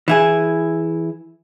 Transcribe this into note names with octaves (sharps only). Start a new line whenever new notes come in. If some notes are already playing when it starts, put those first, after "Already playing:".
E3 E4 G#4